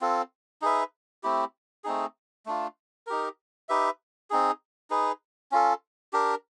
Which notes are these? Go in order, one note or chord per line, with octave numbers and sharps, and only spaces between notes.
C4 F4 A4
D#4 G#4 B4 E5
A3 C4 E4 G4
A3 C4 D#4 G#4
A3 D4 F4
D#4 G4 A#4
D#4 G4 B4 E5
C4 D#4 G#4
D#4 G#4 B4
C#4 F4 A4
D4 G4 A#4